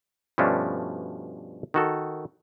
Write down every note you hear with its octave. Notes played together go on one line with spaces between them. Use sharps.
G2 B2 F3 A3 C#4 D4
D#3 F#4 A4